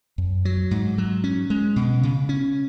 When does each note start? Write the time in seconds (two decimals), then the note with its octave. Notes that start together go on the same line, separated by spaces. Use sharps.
0.18 F#2
0.45 F#3
0.71 G#2
0.98 F#3
1.24 C#4
1.50 G#3
1.76 B2
2.03 C#3
2.29 C#4